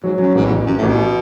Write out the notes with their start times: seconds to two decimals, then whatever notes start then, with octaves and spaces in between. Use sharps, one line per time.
0.03 G#2 F#3
0.19 F#2 F#3
0.35 A1 G#2
0.46 E2
0.50 A1
0.66 A1 F#2
0.77 A2
0.82 A1
0.88 B2